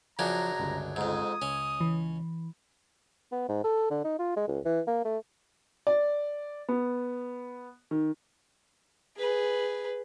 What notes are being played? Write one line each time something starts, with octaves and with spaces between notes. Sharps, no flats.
F#2 C#3 F3 D4 A#5 G#6
G1 C#2
F2 G#2 D#6
C#2 C#4
E3
B3
G#2
A4
D3
D#4
F4
G#3
C#2
E3
A#3
A3
D5
B3
D#3
G#4 B4